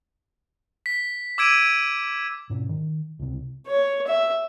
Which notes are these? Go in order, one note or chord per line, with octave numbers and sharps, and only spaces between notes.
B6
D6 E6 G#6 D7 D#7
G#2 B2 C#4
D#3
C#2 C3
C#5
E5